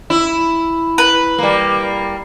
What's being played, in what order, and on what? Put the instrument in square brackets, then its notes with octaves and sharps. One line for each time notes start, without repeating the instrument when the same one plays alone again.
[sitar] E4
[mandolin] B4
[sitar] G3 A#3